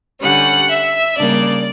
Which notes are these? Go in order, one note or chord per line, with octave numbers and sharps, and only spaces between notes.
D3 G3 C#4 F#5
E5
C#3 G3 A#3 D4 D5